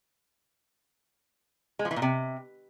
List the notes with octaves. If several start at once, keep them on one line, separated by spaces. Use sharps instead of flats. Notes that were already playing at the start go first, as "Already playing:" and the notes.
G#3
F3
E3
A#2
C3